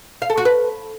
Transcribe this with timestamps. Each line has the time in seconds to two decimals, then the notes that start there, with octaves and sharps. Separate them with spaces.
0.22 F5
0.30 A4
0.38 F#4
0.45 B4